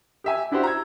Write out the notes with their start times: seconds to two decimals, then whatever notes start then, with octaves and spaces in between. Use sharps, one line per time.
0.24 G4 E5 G#5
0.51 D4 E4 F#4 G4 C5
0.63 A#5 E6 G#6